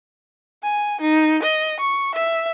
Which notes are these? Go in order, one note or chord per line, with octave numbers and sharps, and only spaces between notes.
G#5
D#4
D#5
C#6
E5